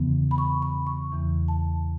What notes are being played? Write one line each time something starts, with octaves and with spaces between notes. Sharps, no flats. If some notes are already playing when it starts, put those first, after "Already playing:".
Already playing: E2 C#3 E3 B3
B5
C#6
B5
C#6
E2 C#3 E3
A5